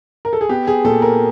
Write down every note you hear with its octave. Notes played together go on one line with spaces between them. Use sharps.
A#4
A4
G#4
B3 G4
G#4
A#2 A4
A#4